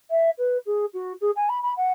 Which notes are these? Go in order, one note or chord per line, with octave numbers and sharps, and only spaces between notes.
E5
B4
G#4
F#4
G#4
G#5
B5
B5
F#5